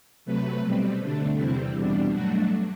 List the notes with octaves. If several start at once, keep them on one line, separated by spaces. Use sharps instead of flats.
C3 F#3 A3 B4
B2 G3 C4
D3 A3 D4
E2 C3 G3 C4 E4
E2 B2 G3 D4
G2 F#3 A3 D4 F#4